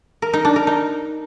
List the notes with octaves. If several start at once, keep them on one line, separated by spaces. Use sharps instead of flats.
A#4
D#4
D4
A#4
D#4